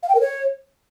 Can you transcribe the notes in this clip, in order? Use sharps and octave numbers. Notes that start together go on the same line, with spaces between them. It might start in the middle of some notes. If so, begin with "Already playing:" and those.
F5
G5
A#4
C#5